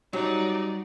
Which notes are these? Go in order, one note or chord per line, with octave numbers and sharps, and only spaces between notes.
F#3 G3 D#4 D5